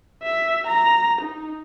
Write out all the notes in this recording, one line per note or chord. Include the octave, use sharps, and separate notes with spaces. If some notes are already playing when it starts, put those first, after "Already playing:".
E5
A#5
D#4